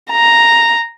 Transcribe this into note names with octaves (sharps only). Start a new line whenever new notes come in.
A#5